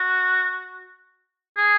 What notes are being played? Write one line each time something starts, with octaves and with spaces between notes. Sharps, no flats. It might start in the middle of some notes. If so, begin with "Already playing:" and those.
Already playing: F#4
G#4